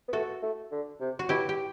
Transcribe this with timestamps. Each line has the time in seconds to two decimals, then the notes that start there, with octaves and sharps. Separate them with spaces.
0.08 B3
0.13 A3 F#4 A4
0.42 A3
0.71 D3
1.00 C3
1.19 F#4
1.29 B2 E4 G4
1.49 G4